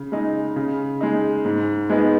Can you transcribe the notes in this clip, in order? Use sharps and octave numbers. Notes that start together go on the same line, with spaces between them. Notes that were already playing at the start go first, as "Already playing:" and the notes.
Already playing: C#3
G#3 D#4
C#3
G#3 D#4
G#2
G#3 B3 D#4